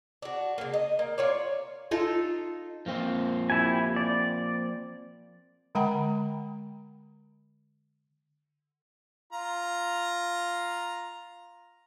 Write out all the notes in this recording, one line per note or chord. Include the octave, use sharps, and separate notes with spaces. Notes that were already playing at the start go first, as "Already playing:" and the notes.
D4 F#4
C#3 A#3
D#5
A#3
F4 C#5 D5
D#4 F4 A4
F3 A#3 C4
E4 G4 G#5
D5
D3 G#3 F#5 G5 A#5 B5
F4 A#5